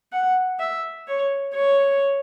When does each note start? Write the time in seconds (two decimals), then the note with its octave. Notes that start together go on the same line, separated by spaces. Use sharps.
0.12 F#5
0.59 E5
1.07 C#5
1.54 C#5